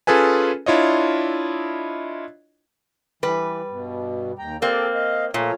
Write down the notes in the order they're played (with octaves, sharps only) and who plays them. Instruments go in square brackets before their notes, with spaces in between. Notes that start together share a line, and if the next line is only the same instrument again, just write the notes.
[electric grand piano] C#4 F4 G#4 A4 B4 G#5
D4 E4 F4 C#5 D#5
[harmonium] E3 [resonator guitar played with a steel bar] G3 B4
[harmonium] G2 B2
D#2 G5 A#5
[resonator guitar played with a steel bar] A#3 C4 [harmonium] G4 A4 D5
[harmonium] D#5 F5
[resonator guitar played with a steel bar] A#2 [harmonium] F3 A3 C#5